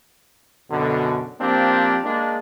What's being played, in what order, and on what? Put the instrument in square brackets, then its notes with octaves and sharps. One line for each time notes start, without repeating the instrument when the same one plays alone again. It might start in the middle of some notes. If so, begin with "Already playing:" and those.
[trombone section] F#2 B2 D3
F3 A#3 C4 D4 G4
G#3 A#3 D4